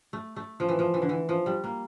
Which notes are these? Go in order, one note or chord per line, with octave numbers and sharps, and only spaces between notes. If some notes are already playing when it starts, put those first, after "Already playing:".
A3
A3
F3
E3
F3
E3
D3
E3
F3
G3
A#3